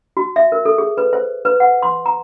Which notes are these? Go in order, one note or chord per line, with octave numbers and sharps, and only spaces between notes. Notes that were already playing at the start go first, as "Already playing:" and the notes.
F#4
E5
A#4
A4
G#4
B4
C5
B4
F#5
C6
A#5